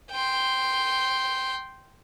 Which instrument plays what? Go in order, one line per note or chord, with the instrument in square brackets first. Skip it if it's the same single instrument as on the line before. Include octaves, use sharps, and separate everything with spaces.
[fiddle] G5 C6